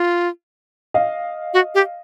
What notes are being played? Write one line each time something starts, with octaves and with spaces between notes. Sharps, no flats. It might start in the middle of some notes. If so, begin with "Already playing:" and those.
Already playing: F4
D#5 F5
F#4
G4